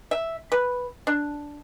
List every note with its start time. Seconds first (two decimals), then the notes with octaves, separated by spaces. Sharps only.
0.11 E5
0.52 B4
1.07 D4